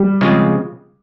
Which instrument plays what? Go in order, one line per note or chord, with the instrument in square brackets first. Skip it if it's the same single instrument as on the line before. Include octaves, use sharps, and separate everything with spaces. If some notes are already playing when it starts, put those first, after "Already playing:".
Already playing: [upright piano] G3
[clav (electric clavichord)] C#3 F3 G#3 C4 F4